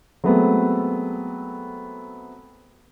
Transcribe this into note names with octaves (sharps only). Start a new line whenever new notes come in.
F#3 G#3 A3 B3 C4 A4